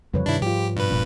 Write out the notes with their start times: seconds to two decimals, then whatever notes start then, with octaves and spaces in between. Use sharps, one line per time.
0.14 F2 C#3 F3 G3 B4 C#5
0.26 G2 C3 D#3 D4 E4
0.42 G#2 F3 F4 G4
0.77 G2 B2 B4
0.90 E1 A#2 D4